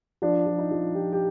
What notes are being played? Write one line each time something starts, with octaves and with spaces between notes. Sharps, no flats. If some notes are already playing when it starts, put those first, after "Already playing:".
F3 D4
F3
D#4
F3
F3 G4
G4